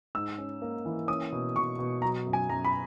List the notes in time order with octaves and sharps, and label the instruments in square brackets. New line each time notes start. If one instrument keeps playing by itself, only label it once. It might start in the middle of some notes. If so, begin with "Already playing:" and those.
[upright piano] G#2 E6
C#4
A#3
E3
C#4 D#6
B2
B2 C#6
B2
F#3 A#5
F#2
G#5
F#2 A#5
B5